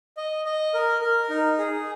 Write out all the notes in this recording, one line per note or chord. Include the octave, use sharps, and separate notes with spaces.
D#5
D#5
A#4
A#4
D#4
G#4